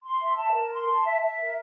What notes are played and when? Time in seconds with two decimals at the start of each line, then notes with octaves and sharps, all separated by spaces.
0.03 C6
0.20 E5
0.37 A5
0.53 A#4
0.71 C6
0.88 A5
1.04 E5
1.21 E5
1.38 A#4